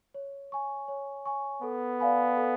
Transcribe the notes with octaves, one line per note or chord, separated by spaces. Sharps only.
C#5
G#5 C#6
C#5
G#5 C#6
B3 A4
D5 F5 G#5 B5
A4